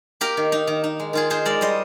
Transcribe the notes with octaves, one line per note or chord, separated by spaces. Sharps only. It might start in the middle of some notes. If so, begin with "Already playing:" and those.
A#3 G4 A#4
D#3
D#4
D#3
D#4
G#3
D#3 F4 G#4
D#4 G#4 C5
G#3 A#4 D5
G3 C5 D#5